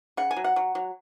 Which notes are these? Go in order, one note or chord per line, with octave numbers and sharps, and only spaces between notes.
C#3 F#5
G#5
F#3
F#5
F#3
F#3